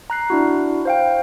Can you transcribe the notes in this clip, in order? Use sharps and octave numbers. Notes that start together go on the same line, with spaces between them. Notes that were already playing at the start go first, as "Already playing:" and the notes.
A#5 F#6 C7
D4 E4 F#4
C5 F5 G5